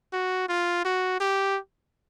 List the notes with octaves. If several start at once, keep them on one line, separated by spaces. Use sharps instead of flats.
F#4
F4
F#4
G4